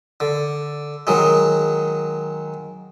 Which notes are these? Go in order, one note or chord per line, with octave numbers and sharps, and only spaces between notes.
D3
D#3 F#3 G#3